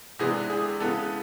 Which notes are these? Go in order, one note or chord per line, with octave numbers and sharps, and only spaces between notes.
C3 E3 G#3 B3 D4 G#4
G#4
C#3 E3 G#3 B3 A4